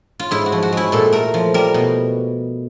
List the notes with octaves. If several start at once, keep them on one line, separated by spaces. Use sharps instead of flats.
F4
G#2 E4
F#4
F3
F#4
G#3 E4
A#2 A4
A3 A#4
F3
G3 A#4
B2